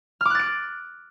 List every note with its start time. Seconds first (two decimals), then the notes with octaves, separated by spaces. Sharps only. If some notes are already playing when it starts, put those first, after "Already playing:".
0.21 F6
0.25 D6
0.30 F#6
0.35 A6
0.39 D7